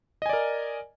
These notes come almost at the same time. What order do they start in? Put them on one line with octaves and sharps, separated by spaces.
D#5 G#5 D5 A#4